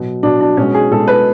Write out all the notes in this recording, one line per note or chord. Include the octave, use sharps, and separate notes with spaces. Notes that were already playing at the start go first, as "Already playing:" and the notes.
Already playing: B2 F#3
B2 F#3 D4
D4
B2 G#3 C#4
G#4
B2 G#3 A4
B4